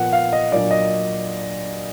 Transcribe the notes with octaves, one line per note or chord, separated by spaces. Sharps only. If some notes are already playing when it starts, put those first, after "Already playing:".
Already playing: A#2 F3 B3 F#5
F5
D#5
A#2 F#3 D4 D5
D#5